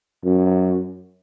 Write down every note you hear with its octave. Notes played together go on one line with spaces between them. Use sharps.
F#2